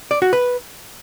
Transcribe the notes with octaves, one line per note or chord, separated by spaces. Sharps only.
D5
F#4
B4